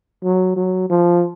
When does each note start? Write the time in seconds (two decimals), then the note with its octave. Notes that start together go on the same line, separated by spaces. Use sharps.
0.24 F#3
0.57 F#3
0.90 F3